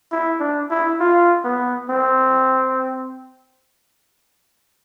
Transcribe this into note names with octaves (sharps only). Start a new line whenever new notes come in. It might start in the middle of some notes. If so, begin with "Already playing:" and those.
E4
D4
E4
F4
B3
C4